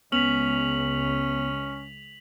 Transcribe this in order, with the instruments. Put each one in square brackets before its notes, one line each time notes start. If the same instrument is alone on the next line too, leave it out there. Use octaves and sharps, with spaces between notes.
[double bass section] C#2 [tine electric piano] B3 [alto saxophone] C#4 [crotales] B6 F7 F#7